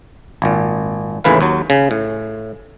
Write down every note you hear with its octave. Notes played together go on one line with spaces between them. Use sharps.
G#1 A#2
D#2 A2 C#3 E3 B4 F5
D#2 F#3
C#3
A2